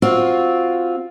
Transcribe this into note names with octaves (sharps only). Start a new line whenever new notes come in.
C4 F4 F#4